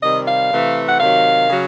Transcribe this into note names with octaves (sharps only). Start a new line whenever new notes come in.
C3 D#3 G3 D#5
F5
C3 E3 A3
F#5
C3 D#3 F#3 F5
C#3 F#3